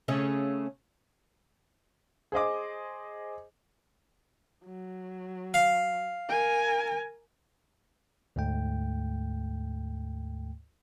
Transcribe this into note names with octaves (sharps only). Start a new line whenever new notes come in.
C#3 A3 C#4
G#4 C5 D#5 D6
F#3
F5
A#4 G#5
D2 G#2 A3 G5